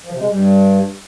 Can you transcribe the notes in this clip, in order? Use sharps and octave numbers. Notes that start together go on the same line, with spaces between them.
F3
C3
G#3
G2